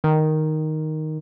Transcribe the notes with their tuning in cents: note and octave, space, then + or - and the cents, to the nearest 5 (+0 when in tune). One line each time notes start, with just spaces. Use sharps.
D#3 +0